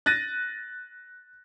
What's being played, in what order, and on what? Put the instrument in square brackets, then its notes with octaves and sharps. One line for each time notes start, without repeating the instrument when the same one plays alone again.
[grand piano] F#6 A6 A#6 D#7